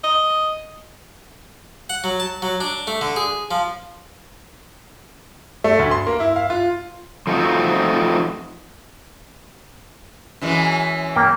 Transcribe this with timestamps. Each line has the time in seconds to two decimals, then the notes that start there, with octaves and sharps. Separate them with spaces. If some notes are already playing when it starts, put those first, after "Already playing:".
0.04 D#5
1.90 F#5
2.04 F#3
2.20 A5
2.42 F#3
2.61 D4
2.87 A3
3.01 D3
3.16 G#4
3.51 F3
5.64 A3
5.79 D2
5.91 C6
6.07 A#3
6.20 E4
6.36 F5
6.50 F4
7.27 F3 A3 C4 D#4 F4 F#4
10.42 F#2 E3 G#3
11.16 A#3 G5